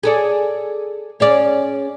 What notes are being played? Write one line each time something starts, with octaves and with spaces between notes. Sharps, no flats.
G#4 A4 D5
C#4 G#4 D5